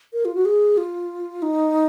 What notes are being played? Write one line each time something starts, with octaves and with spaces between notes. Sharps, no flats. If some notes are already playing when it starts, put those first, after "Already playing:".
A#4
F4
F#4
G#4
F4
D#4